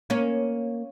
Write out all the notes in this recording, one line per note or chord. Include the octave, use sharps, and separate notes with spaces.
A#3 C#4